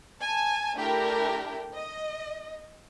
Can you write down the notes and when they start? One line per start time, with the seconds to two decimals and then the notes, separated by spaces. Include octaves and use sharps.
0.20 G#5 A5
0.75 A3 D4 E4 G4 A#4 G5
1.74 D#5